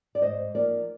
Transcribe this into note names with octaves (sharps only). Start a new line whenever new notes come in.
D5
G#2 C5 D#5
F3 A#3 D#4 A#4 D5